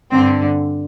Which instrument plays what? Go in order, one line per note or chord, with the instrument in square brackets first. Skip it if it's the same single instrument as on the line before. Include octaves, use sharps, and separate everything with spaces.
[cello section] G2 D3 C4